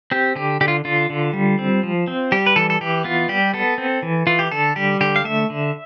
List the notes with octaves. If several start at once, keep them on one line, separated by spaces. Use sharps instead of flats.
C4 G4
D3 G4
D3 G4
F4
D3 F4
D3
G3
C4
F3
C4
G3 G4
B4
E3 A4
A4
E3 G4
B3 F4
G3 G4
B3 A4
C4
E3
E3 F4
G4
D3 A4
G3 G4
D3 G4
F5
A3 E5
D3